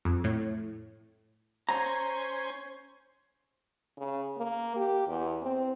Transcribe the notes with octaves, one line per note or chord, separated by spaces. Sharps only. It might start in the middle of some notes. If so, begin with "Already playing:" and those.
F2
A2
C#4 C5 G#5 A#5
C#3
A#3
G4
E2
C4